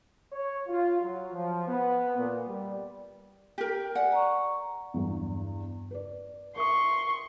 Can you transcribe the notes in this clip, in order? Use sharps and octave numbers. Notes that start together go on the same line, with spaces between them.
C#5
F4
F#3
F3
B3
A#2
G3
G4 A#4
D5 F#5 G#5
A#5 C#6
E2 G2
B4 D5
A#4 E5 C6 C#6 D#6